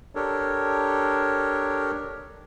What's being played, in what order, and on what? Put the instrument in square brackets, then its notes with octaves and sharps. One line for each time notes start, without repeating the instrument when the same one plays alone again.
[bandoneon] D4 G4 A4 A#4 C#5